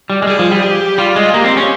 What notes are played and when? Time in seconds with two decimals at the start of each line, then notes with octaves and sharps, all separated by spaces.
0.10 G3
0.22 G#3
0.27 G3 G#4
0.39 F3
0.51 G3
0.62 G4
0.98 G3 F4
1.16 G#3
1.33 A#3 G4
1.45 C4
1.57 C#4